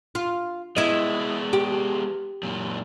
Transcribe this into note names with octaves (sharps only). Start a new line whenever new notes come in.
F4
G#3 B3 E4 D#5
G4
F#2 A#2